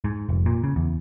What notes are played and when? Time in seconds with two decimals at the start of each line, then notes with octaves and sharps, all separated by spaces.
0.04 G#2
0.29 F1
0.46 A#2
0.64 C#3
0.76 E2